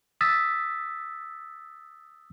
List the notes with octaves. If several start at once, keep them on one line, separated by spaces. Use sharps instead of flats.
D#6 E6 A6 B6